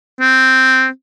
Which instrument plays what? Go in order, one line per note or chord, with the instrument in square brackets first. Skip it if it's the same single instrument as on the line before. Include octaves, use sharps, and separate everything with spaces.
[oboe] C4